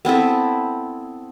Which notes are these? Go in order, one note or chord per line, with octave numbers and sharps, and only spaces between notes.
B3 C4 E4 A4